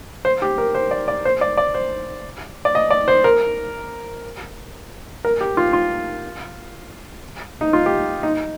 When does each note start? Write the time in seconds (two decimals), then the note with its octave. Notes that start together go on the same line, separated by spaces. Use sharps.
0.25 C5
0.42 G4
0.58 A#4
0.75 C5
0.91 D5
1.08 D5
1.25 C5
1.41 D5
1.57 D5
1.74 C5
2.65 D5
2.75 D#5
2.91 D5
3.08 C5
3.24 A#4
5.25 A#4
5.41 G4
5.57 F4
5.73 F4
7.61 D#4
7.73 F4
7.86 G4
8.23 D#4